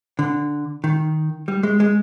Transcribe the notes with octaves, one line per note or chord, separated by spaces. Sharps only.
D3
D#3
G3
G#3
G#3